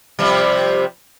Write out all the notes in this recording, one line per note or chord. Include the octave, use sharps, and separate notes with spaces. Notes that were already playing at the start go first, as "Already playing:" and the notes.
C3 F3 G3